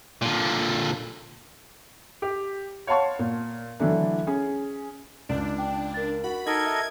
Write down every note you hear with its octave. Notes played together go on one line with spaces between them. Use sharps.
A#2 D3
G4
C#5 F5 F#5 A5 C6 C#6
A#2
D3 E3 F#3 A3 D4
C#4 G#4
C#2 D4
G5
A#4 A6
F#4 B5
D#4 A4 A#4 D#5 G#6
E5